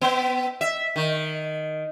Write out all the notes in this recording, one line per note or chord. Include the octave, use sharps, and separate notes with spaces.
B3
E5
D#3